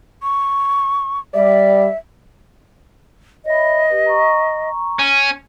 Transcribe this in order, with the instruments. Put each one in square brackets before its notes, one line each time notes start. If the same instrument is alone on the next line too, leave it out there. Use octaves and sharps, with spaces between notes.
[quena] C#6
[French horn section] G3 D5 [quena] E5
[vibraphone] C#5 E5 B5 [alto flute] D#5
[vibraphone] G4 B4
A#5 C#6
[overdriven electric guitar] C#4